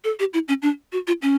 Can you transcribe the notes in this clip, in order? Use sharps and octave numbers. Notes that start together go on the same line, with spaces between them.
A4
G4
E4
C#4
D4
F#4
F4
C#4